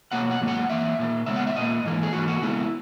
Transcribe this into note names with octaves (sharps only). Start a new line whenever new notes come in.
B2 F#3 A#3 F#5
F#5
G#2 F#3 A#3
F#5
F#2 E3 A#3 E5
A#2 A#3
C#3 G#3 B3 E5
F#5
E5
A#2 A#3 D#5
G#2 E3 A#3
G#4
G#2 E3 A#3 F#4
F#4
C#3 G#3 B3 E4